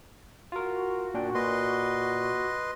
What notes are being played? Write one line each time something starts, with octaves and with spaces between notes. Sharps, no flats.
F4 F#4 A#4
A#2 D4 G5
A#2 B4 D#5 C6